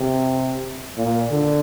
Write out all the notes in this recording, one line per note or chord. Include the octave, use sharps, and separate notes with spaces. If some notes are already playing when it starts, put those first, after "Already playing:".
Already playing: C3
A#2
D3